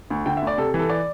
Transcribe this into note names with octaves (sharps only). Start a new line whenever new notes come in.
D2
D3 G5
E5
D2 D5
C3 A4
E3
A4
D5